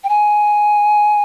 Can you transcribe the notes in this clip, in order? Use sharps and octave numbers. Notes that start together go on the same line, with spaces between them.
G5
G#5